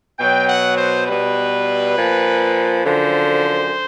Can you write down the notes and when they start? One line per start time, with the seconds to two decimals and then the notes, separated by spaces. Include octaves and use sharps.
0.19 B2 F#3 G5
0.48 F#5
0.77 C5
1.06 B2 G3 B4
1.96 A#2 F3
2.83 F#2 D3 F3 C5